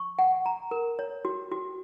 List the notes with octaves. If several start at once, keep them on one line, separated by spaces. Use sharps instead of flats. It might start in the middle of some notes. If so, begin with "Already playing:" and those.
Already playing: C#6
F#5
A#5
A#4
C#5
F#4
F#4